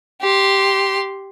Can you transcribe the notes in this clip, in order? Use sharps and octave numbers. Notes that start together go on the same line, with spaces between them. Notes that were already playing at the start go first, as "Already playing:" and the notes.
G4 C6